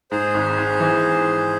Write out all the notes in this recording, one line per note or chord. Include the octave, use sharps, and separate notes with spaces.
G#2 G#4 C5
G#1
G#1
E3